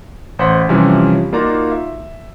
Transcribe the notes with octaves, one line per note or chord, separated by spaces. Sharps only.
A1 C5 F#5 B6
C3 E3 F3 G3 C#4
A#3 D#4 F4 F#4 D5 A#5
E5